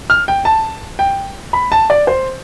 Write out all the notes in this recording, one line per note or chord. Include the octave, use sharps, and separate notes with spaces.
F6
G5
A5
G5
B5
A5
D5
C5